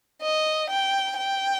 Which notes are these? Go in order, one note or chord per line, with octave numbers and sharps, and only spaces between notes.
D#5
G5
G5